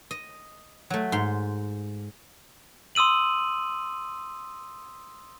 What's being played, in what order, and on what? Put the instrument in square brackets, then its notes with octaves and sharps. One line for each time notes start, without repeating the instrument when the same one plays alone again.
[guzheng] D#5
F#3 A3
G#2 C6
[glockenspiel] C6 D#6 E6 D#7 F#7